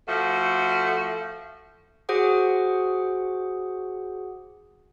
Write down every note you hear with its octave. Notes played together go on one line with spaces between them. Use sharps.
F3 A3 F#4
F#4 G#4 C5 F#5 D6